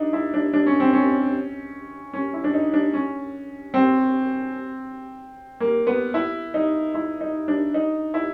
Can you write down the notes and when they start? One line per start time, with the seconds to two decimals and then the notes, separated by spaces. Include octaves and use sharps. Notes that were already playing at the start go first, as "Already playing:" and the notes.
Already playing: D4 D#4
0.13 E4
0.34 D4
0.53 D4
0.66 C#4
0.80 C4
0.93 C#4
2.13 C#4
2.34 E4
2.44 D4
2.54 D#4
2.74 D4
2.94 C#4
3.74 C4
5.60 A#3
5.87 B3
6.14 E4
6.54 D#4
6.94 E4
7.21 D#4
7.48 D4
7.74 D#4
8.14 E4